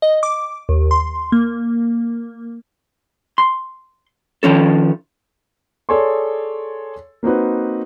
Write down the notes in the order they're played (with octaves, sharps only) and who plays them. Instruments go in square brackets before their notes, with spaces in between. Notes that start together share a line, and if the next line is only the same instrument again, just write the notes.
[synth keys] D#5
D6
D#2
C6
A#3
[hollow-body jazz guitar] C6
D#3 F3 C#4 A4
[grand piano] G#4 A4 C#5 D5 G#5 C6
A#3 C4 D#4 F#4 B4